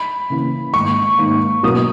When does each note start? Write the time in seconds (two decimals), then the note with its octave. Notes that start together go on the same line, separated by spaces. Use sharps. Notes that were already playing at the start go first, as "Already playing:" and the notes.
Already playing: B5
0.30 C#3 E3 A#3
0.74 G#2 D#3 A#3 C#6
1.18 G#2 D#3 A#3
1.63 B2 F#3 A#3 E4 A#4 D#6